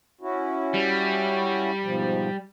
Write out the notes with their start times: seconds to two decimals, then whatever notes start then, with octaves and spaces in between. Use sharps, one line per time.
0.21 C#4 E4 F#4
0.74 G3
1.83 G#2 B2 F3